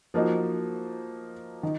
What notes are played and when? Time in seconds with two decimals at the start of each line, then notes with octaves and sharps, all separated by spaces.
0.14 F3 A#3 D#4 F#4
1.63 D#3